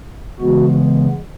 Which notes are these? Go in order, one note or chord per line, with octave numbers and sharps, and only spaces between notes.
C#3 E3 G#3 B3 F#4